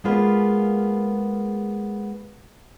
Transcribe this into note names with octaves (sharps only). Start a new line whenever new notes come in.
G#3 A#3 B3 F4 G#4 B4